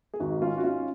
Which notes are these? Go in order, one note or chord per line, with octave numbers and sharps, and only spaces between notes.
G#4
G#1 D#4 F#4
G#2
C#4 F4
G#2 F#4
C#4 F4